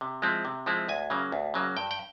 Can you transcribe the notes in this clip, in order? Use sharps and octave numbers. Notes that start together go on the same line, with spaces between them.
C3
F3 G#3 C4 E4
C3
F3 G#3 C4 E4
D2 G#5
C#3 F#3 A#3
D2
C#3 F#3 A#3
G2 G5
G5